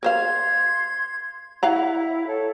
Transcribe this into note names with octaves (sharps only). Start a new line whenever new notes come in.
A#4 C5 F5 C6 G#6
E4 F5 F#5 A#5
A4 C#5